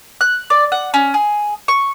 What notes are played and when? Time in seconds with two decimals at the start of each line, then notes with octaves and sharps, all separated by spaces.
0.21 F#6
0.50 D5
0.72 F#5
0.94 C#4
1.14 G#4
1.68 C#6